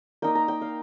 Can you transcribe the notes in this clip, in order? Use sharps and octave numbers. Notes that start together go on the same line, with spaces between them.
A#3 D#4 G5
A#5
G5
F5